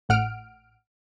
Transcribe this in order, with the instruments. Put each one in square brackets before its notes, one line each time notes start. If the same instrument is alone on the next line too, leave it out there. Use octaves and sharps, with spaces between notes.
[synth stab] A1 A2 F#5 F6 D7